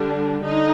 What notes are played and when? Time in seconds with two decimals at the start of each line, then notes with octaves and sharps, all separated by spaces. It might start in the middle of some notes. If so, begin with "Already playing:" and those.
Already playing: D3 G3 D4
0.43 D3 D#4